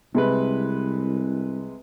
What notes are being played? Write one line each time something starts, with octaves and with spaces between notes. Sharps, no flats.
C2 C3 G#3 B4